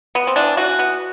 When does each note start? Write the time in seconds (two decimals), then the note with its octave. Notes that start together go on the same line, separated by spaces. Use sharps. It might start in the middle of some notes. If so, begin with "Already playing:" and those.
0.15 B3
0.27 C4
0.36 E3 D4
0.57 E3 F#4
0.79 B3